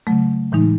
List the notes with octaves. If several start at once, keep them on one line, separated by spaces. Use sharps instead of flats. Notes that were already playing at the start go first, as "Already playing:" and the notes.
C#3 F#3 A3
A2 E3 G#3 D#4